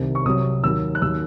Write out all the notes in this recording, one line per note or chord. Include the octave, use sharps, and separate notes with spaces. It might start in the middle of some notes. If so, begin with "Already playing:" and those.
Already playing: C2 C3 D#3
C#6
C2 C3 F#3 D#6
D#2 D#3 F#3 E6
F#6
D#2 D#3 F#3 E6